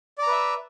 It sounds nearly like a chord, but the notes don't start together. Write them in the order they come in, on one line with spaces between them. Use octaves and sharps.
D5 A#5 B4 E5